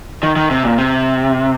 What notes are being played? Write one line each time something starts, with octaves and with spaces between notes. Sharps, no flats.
D#3
D#3
C3
A#2
C3